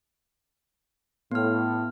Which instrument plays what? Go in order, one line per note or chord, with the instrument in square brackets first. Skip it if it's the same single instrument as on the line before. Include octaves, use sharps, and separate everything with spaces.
[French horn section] A2 [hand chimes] B3 F6